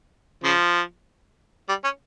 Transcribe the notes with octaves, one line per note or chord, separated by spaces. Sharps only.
C#3 F3
G3
C#4